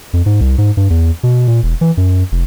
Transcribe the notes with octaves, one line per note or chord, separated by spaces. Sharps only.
F2
G#2
C2
G#2
G2
E2
B2
A#2
E1
E3
F#2
F1